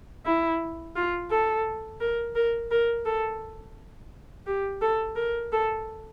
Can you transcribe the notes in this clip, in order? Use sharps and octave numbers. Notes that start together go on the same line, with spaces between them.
E4
F4
A4
A#4
A#4
A#4
A4
G4
A4
A#4
A4